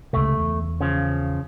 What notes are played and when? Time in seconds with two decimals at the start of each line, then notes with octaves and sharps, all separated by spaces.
0.13 C#2 C3 A3
0.37 E2
0.81 C#3 F3